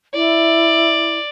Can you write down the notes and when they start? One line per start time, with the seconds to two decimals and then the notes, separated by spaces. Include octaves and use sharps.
0.14 E4 D5